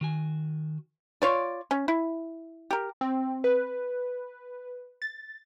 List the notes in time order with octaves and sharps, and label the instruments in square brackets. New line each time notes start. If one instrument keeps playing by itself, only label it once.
[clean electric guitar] D#3 F#4 G#5
[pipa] F4 C#5 D5
C#4
E4
G4 A#4
[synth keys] C4
B4
A6